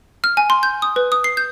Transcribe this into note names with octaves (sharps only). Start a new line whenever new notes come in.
F6
G#5
C6
G6
D#6
B4
D#6
C7
G6